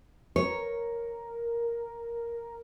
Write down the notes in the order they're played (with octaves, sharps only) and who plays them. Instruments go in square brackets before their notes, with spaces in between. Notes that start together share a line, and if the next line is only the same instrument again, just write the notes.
[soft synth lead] A#4 [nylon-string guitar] C#5